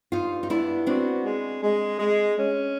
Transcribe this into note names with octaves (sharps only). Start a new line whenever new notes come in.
G2 D#4 F4
D#4
B3 D4 E4
C4 D4 F#4
G#3
G#3
G#3
C#4